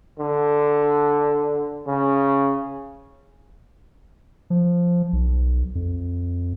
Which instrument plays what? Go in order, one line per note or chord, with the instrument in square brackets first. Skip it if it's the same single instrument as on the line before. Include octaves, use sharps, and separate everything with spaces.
[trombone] D3
C#3
[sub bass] F3
B1
F2